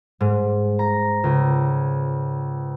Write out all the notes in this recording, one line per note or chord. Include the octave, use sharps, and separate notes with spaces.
G#2
A#5
C#2